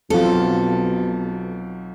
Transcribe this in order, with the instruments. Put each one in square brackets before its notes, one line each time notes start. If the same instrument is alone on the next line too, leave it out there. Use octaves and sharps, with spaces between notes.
[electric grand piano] B1 F#3 [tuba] B2 [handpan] C4 F4 [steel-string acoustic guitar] A4